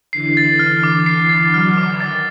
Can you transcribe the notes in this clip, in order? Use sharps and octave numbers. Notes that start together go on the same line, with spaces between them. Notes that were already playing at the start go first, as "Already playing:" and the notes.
D3 E3 C7
A6
D3 F6
D6
D3 E3 C7
A6
E3 F#3 F6
D6
D#3 A6